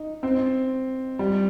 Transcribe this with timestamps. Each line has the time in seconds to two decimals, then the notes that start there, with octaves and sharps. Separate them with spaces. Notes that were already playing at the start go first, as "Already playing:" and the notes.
Already playing: D#4
0.23 C4
1.19 G3